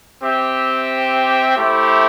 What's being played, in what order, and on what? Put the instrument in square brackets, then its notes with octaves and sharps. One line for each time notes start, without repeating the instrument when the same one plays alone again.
[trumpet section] C4 G4 E5 G5
A3 E4 G4 C5